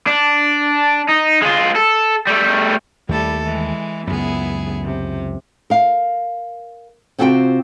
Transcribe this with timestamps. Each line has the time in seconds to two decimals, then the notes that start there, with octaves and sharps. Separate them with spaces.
0.07 D4
1.08 D#4
1.42 G#3 F4
1.75 A4
2.27 G3 A3
3.09 D#2 G3 A3 E4 A4
3.44 E3 G#3
4.07 C#2 F#2 B3 E4 G#4
4.83 C3
5.70 A#4 F5
7.18 C3 C4 F4 F#4 F5 G5